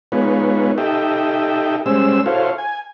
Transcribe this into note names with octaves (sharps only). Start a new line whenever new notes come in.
G#3 B3 D#4 F4 B4 C#5
D#4 G4 A4 D#5 E5 G5
G3 G#3 C#4 C5 E6
E4 F#4 A4 C5 C#5 F5
G#5